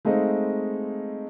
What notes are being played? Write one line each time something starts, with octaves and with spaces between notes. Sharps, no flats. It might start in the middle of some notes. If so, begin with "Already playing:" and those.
G#3 A3 C4 D#4 D#5 F5